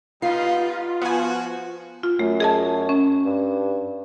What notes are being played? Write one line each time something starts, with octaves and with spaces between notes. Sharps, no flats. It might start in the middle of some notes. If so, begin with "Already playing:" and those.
G3 B3 D#4 F4 F5 C7
F3 B3 F#4 G#5
F4
F#2 A3
G#4 D#5 A5
C#4
G2